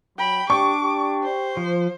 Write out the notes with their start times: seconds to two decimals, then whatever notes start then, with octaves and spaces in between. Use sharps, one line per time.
0.18 F#3 G5 B5
0.50 D4 G4 C#6 D6
0.83 G4
1.24 C5
1.57 F3